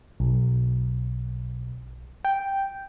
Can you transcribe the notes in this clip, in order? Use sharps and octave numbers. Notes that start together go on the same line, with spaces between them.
B1
G5